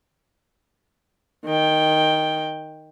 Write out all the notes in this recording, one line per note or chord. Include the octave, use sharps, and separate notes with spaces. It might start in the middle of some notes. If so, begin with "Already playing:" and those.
D#3 G5